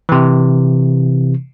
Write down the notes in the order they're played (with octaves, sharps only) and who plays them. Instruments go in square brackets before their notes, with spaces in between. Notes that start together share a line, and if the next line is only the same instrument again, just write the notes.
[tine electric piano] C3 E3